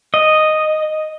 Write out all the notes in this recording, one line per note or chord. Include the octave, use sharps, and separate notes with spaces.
D#5